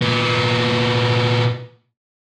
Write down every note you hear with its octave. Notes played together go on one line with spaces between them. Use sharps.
A#2 B3